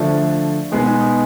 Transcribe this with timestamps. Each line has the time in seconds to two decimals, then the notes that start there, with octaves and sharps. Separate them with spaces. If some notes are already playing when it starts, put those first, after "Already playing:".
Already playing: D3 F3 A3
0.72 B2 G#3 B3 D#4 G#4